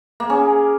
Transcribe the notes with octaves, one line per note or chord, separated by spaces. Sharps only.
A#3
C#4 G#4